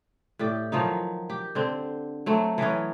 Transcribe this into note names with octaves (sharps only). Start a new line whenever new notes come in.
A2 G4 D5
D#3 F3 F#3 D#4
G4
D3 C4
F#3 A3 C4
E3 F#3 B3 C#4